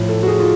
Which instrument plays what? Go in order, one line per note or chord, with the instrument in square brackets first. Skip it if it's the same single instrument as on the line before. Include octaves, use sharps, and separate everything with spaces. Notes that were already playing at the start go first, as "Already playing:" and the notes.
Already playing: [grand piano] A2 F3
A4
F#4
G#4
F4